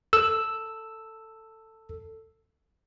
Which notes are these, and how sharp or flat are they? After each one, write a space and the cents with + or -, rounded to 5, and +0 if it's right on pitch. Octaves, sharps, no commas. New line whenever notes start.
A4 +15 E6 +0